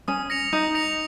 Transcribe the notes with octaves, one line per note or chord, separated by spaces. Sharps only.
C#4 D#6
A#6 C#7 F7
D#4 D#6
A#6 C#7 F7